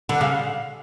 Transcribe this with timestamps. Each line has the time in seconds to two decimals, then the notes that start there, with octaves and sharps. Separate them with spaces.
0.09 D3 F#5
0.21 C#3 F5